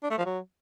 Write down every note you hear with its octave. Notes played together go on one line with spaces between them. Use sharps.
D4
A3
F3
F#3